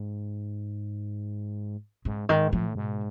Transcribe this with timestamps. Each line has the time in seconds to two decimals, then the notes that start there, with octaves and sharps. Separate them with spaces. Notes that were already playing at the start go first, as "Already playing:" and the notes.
Already playing: G#2
2.05 G#2 C#3
2.29 G#2 D#3
2.52 A2 F3
2.75 G#2 B2